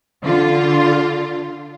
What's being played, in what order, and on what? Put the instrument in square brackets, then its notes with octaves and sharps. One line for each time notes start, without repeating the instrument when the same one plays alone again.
[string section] D3 F4